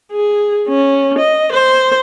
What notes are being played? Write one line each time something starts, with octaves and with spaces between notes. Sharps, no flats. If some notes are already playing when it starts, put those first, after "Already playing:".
G#4
C#4
D#5
C5